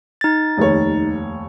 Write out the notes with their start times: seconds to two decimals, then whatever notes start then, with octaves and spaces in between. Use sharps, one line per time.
0.21 D#4 A6
0.57 F1 D#2 C#5